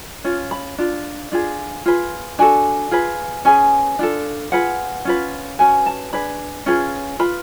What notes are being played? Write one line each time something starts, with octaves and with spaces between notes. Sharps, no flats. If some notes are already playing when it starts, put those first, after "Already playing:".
C#4 F4
B5
D4 F4
D4 F4 G#4
F4 G#4 B4
D4 F#4 A4 G#5
F4 G#4 B4
C#4 G#4 B4 G#5
D4 F4 A4
F4 G#4 B4 F#5
C#4 F4 B4
C#4 F#4 B4 G#5
A5
D4 G#4 B4 B5
C#4 F4 G#4 B4
F4 B4 B5